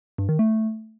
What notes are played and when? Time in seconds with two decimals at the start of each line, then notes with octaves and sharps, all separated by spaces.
0.18 G2
0.29 D#3
0.39 A3